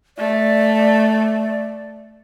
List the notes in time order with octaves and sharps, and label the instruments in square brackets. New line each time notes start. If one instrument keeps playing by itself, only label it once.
[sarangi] A3 [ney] D5